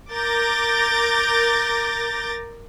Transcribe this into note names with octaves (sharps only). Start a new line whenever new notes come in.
A#4 D6 G6 A6 A#6